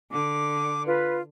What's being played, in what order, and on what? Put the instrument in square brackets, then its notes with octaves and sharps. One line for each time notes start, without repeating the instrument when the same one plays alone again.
[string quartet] D3 [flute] D6
[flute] F4 [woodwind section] B4